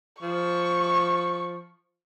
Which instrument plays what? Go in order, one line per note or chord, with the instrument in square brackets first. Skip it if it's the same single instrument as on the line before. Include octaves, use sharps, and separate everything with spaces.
[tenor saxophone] F3 [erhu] C#6